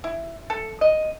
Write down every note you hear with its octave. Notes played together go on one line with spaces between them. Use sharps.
E4
A4
D#5